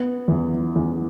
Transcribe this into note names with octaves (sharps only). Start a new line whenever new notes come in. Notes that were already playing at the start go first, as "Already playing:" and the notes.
Already playing: B3
E2
E2